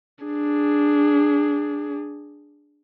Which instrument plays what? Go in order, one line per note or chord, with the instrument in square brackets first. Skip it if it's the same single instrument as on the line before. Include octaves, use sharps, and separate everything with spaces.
[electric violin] D4 G#4